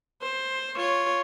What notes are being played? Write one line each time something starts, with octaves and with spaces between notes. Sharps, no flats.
C5
F4 C#5